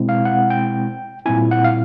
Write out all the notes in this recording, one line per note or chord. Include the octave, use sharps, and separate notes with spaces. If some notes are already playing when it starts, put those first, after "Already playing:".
Already playing: B2 G#3 C4 E4
F5
F#5
G5
A#2 G3 C4 E4 G#5
F#5
F5